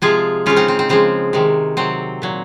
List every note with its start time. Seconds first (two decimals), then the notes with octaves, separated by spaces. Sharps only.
0.02 C3 F3 G#3 F4 G#4
0.46 C#3 G#3 C#4 F4
0.56 C4 D#4
0.68 C4
0.79 C4
0.89 C#3 F3 G#3 C4
1.33 C3 D#3 G#3
1.77 C3 F#3 C4
2.22 A#2 F#3